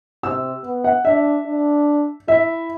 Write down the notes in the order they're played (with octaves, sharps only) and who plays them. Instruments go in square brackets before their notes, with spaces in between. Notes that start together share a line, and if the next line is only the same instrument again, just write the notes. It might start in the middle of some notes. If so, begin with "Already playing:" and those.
[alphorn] C3 [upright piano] E6
[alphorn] B3
[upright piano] F#5
[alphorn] D4 [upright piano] E5
[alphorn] D4
[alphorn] E4 [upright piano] E5